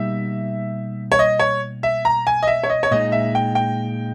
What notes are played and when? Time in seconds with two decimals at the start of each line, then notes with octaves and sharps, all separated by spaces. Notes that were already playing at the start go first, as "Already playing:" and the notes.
Already playing: B2 G3 A#3 D#4 G4 E5
1.12 C#5
1.19 D#5
1.39 C#5
1.83 E5
2.05 A#5
2.27 G#5
2.43 D#5
2.47 E5
2.63 C#5
2.70 D#5
2.83 C#5
2.91 A#2 G#3 D#4 D#5
3.12 E5
3.35 G5
3.55 G5